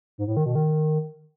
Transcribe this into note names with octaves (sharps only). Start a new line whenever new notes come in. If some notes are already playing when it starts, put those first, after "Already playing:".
G#2
A2
D#3
B2
D#3